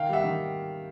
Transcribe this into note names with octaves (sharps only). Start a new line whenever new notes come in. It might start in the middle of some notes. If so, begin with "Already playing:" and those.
Already playing: D#3 F5 G5
G3 E5 F#5
D#3